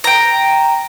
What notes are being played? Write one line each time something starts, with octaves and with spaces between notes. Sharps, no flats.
G5 A#5